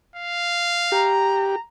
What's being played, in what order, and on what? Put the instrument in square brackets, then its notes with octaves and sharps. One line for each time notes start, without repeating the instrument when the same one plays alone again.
[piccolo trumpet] F5
[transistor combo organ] G4 [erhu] A#5